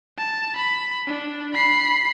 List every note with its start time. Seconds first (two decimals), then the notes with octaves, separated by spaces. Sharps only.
0.17 A5
0.56 B5
1.07 D4
1.54 B5 C7